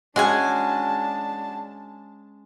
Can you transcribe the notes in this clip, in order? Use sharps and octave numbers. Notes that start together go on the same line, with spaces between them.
G#3 C#4 D4 F#4 G#4 G#5 A5